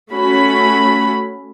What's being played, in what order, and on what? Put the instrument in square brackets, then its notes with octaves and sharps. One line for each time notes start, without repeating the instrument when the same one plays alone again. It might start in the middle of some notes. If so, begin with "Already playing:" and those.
[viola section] A3 C#4 F#4 B5